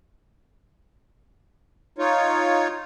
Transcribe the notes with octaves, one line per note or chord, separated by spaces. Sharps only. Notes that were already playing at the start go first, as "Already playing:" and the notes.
D#4 F4 C#5